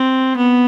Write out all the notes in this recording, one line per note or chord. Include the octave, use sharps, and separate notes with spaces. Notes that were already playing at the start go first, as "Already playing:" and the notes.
Already playing: C4
B3